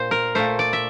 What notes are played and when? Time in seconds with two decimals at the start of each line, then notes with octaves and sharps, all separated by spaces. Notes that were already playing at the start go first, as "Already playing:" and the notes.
Already playing: A#2 C5
0.11 A#4
0.35 A#2 A3 C5
0.59 D5
0.73 E5